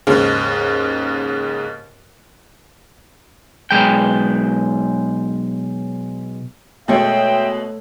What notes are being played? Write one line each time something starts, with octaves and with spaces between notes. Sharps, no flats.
D#2 G#2 C#3
B1 G#3 G5
B2 G#3 A3 C#5 E5 G5